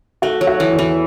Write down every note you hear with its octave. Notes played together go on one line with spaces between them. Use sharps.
A3 F#4
F#3
F#4
E3
E2
E3